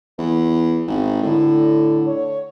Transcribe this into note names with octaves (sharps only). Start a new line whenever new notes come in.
E2
G#1
A2 D3
C#5